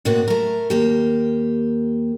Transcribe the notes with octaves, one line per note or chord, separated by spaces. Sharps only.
A2 C3 A#3 B3 F#4
A3 A#4
D#2 A#3 G4